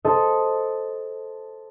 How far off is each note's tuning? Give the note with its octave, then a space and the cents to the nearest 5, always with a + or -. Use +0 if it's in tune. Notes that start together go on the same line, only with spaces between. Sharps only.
A4 +0 C5 +0 D#5 +0